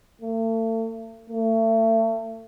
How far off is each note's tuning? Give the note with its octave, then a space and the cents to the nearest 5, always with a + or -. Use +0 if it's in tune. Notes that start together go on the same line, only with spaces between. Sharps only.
A3 +40
A3 +35